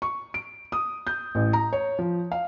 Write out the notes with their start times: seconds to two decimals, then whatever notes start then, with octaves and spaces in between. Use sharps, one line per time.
0.02 C#6
0.34 D7
0.72 D#6
1.07 G6
1.35 A1
1.53 A#5
1.73 C#5
1.99 F3
2.32 F5